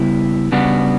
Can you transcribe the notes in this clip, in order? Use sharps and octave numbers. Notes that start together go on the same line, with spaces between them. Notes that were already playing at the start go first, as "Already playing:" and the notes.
Already playing: C#3 G3 B3 E4 G4
C#3 G3 B3 D4 F#4